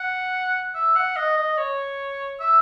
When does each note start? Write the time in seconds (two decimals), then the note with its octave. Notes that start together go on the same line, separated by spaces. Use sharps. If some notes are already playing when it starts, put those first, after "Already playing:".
Already playing: F#5
0.75 E5
0.96 F#5
1.16 D#5
1.37 D#5
1.58 C#5
2.40 E5